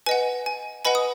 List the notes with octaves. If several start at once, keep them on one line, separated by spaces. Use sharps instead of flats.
B4 D#5 F#5 G#5
G#5
B4 D#5 F#5 G#5 B5
D#6